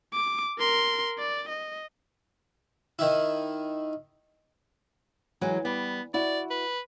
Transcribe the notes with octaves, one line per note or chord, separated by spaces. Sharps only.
D6
A#4 C6
D5
D#5
D#3 E4
E3 F#3 G#3
G3 B3
E4 F#4 D5
B4